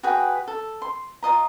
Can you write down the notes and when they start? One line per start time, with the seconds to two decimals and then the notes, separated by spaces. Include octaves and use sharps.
0.03 F#4 G#4 B4 G5
0.48 A4
0.82 C6
1.23 F4 D#5 A#5